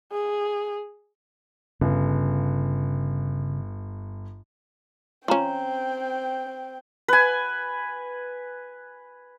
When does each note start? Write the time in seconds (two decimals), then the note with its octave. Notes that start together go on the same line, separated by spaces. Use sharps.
0.12 G#4
1.81 G1 C#3
5.28 C4 C#4 F4 G5 A#5 C6
7.08 B4 G#5